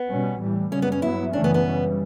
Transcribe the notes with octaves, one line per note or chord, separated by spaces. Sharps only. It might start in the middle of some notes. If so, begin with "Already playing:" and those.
Already playing: B3
B2 G3 C#4
A2 E3 G3
F#2 C#3 G3 C#4
B3
C#4
G2 F#3 B3 E4
F#2 C#3 E3 A3 C#4 D4
B3
B3
C#3 E3 G3